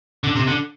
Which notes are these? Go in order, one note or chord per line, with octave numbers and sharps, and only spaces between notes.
D3
C3
D3